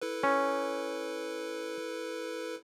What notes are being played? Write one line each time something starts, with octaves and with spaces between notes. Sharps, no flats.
E4 A4 B4
C#4